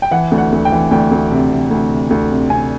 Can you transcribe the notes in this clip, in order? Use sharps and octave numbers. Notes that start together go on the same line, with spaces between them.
G5
E3 F#5
D2
F#5
D2
G5
E3
D2 G5
D2
C3
C3
D2
C3
D2
C3
C3 G#5